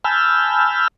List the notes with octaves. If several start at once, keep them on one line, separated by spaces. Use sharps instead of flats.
G#5 A5 B5 E6 F6 G6